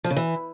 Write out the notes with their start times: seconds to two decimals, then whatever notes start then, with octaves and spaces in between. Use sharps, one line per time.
0.04 F3
0.10 C#3
0.16 E3